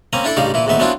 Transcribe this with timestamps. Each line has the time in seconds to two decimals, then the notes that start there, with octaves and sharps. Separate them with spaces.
0.13 A#3 C4 C#4 G#5 A#5
0.24 D4 E4 A4 D5
0.37 A1 G2 C#3 G3 D#4 F5
0.54 A#2 E3 E4
0.66 A#1 E2 A2 D#3 B3 E5
0.79 F#3 B3 C4 D4 E4 F4